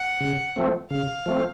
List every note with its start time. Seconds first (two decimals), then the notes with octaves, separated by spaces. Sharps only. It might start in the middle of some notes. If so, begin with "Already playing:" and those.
Already playing: F#5
0.20 C#3
0.56 F3 A3 C4
0.90 C#3 F5
1.26 F3 A3 C4